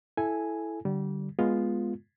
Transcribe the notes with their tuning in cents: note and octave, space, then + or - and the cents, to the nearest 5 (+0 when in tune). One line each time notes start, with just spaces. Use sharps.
E4 +0 A4 -15 G#5 +0
D3 +0 G3 -25
G#3 +0 B3 -5 F4 +0